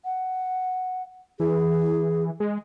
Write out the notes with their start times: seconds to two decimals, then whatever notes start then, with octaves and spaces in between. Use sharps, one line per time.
0.05 F#5
1.40 E3 G#4
2.40 G#3